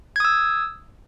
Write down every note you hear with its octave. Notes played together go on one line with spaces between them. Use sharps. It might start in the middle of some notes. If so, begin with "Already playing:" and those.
D#6 E6 G#6